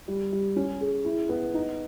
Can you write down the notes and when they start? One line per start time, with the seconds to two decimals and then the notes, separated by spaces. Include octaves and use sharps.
0.08 G3
0.32 G3
0.56 C#4
0.81 G#4
1.05 E4
1.29 B3
1.54 D#4